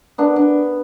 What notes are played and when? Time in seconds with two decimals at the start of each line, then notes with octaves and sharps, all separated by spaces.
0.18 B3 D4
0.36 D4